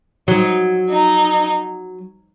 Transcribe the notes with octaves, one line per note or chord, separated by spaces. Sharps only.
F#3 D#4
D#4